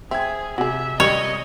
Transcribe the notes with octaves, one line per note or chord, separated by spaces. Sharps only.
C4 G#4 E5 G#6
C3 F#4 G#4 E5
G3 C#5 D#5